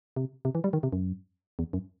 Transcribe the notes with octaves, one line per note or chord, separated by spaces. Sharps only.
C3
C3
E3
G3
D#3
C3
F#2
E2
F#2